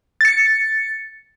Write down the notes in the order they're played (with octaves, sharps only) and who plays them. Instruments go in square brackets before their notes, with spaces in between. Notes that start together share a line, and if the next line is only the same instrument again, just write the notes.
[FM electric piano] A6 C#7